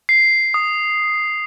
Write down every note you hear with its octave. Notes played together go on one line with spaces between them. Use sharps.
C7
D#6